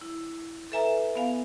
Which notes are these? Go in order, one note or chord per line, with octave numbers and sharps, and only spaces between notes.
E4
A4 B4 E5 G#5 A#5
B3 F5 G#5